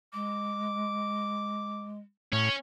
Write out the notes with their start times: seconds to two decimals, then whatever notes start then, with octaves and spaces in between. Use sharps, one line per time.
0.13 G#3 D6
2.33 A2 C#4 C#5